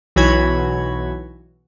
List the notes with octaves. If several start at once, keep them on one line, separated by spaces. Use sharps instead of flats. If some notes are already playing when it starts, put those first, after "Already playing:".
B1 E3 F#4 C#5 B5 G#6